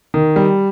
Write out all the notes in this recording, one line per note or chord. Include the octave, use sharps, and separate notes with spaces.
D#3
G3